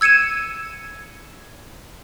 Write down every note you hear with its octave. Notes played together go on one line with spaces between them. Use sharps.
E6 G#6 C#7 D#7 E7